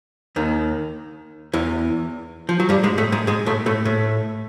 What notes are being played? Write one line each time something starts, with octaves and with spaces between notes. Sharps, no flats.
D#2 D#3
E2 E3
F3
F#3
G2 G3
G#2 G#3
A2 A3
G#2 G#3
G#2 G#3
A2 A3
A2 A3
A2 A3